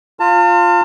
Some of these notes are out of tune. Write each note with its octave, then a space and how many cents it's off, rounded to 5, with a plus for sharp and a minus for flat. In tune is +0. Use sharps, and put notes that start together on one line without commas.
F4 +0 A5 +40